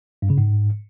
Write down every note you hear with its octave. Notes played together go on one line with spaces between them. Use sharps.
G2
C#3
G#2